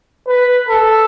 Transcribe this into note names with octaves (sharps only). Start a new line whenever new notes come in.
B4
A4